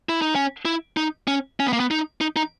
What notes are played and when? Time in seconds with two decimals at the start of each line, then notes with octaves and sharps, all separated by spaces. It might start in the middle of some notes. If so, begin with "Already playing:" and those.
0.09 E4
0.22 D#4
0.35 C#4
0.65 E4
0.97 D#4
1.28 C#4
1.60 C#4
1.67 B3
1.73 A#3
1.80 B3
1.91 D#4
2.21 D#4
2.36 D#4